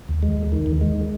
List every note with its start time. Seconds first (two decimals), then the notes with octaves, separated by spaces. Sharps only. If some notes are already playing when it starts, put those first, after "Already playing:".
0.08 D#2
0.23 G#3
0.37 D#2
0.52 D#3
0.66 D#2
0.81 G#3